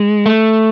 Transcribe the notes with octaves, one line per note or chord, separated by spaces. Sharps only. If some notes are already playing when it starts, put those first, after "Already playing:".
Already playing: G#3
A3